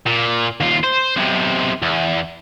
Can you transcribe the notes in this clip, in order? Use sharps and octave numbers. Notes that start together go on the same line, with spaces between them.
A#2
D#2 F4
C5
B1 C3
E2